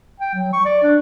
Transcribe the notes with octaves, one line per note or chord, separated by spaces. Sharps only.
G5
F#3
C#6
D5
D4